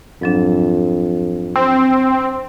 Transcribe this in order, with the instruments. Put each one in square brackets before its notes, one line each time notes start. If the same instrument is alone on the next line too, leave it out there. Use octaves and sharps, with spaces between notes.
[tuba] F2 [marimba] G#2 F#3 D4
[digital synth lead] C4